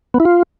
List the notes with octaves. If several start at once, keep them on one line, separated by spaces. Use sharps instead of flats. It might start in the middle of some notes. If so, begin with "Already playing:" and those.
B3
E4
F4